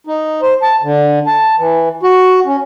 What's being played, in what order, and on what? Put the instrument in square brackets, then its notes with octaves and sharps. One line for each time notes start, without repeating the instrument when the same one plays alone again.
[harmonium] D#4
C5
A5
D3
A5
E3
F#4
C#4